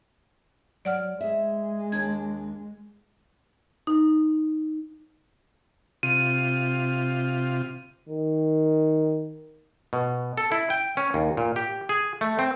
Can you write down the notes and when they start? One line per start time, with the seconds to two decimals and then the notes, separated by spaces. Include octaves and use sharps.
0.85 F#3 D5 F#5 F6
1.21 G#3 G#4 D#5 E5
1.92 D#2 D4 G#6
3.87 D#4
6.03 C3 F4 D#7
8.09 D#3
9.93 B2
10.37 A4
10.52 E4
10.70 G5
10.97 C#4
11.14 D#2
11.37 A#2
11.56 G4
11.89 G#4
12.21 A3
12.39 C4